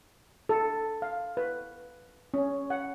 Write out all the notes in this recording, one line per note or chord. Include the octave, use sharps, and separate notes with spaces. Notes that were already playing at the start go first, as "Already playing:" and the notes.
A4
F5
B4
C#4
F#5